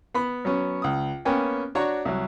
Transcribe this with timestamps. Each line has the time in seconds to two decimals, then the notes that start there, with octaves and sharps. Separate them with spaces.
0.14 B3 B5
0.45 F#3 B3 C#4
0.82 C#2 D#6
1.25 A#3 B3 C#4 G5 G#5
1.75 D4 F#4 C#5 A#5 C#6
2.05 C2 F#3